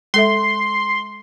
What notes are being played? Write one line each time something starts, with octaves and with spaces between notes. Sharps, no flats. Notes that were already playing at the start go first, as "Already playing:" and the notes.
G#3 A4 E5 C6